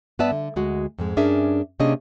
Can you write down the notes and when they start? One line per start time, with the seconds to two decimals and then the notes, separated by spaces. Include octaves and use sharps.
0.19 G2 B3 B4 D5 E5 A5
0.31 D3
0.56 D2 G#3 F#4
0.98 F2 G#2 G#3
1.17 G2 C#4 D4 G#4 A#4 E5
1.80 C3 A#3 C#4 D4 G#4 D#5